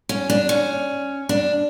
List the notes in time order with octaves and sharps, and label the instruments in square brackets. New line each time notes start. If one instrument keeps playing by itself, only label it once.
[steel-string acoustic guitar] C#4
D4
C#4
D4